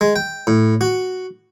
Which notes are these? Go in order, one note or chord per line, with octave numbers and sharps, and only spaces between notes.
G#3
G5
A2
F#4